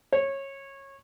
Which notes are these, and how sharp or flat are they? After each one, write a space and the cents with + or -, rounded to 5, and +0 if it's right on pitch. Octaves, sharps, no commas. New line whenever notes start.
C#5 -20